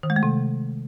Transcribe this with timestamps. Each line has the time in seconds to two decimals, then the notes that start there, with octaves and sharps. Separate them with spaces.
0.03 D#3
0.10 G#3
0.16 A3
0.23 C3